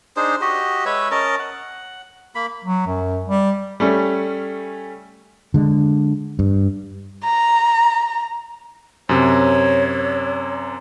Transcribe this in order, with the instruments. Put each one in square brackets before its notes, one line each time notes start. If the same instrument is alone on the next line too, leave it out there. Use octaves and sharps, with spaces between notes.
[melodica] D4 D#4 G#4 C5
F#4 G4 D#5
G#3 B4 C#5 E5
C#4 A#4 D#5 A5
F#5
A#3 B5
[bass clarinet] F#3
F#2
G3
[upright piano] G3 A3 C#4
[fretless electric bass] D3 G#3
G2
[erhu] A#5
[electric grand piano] F#2 C3 [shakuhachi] C#5